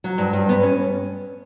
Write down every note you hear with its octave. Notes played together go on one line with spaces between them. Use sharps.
F#3
G2
G2
B3
C#4